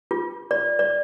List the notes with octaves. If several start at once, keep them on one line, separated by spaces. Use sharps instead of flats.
F4
D5
D5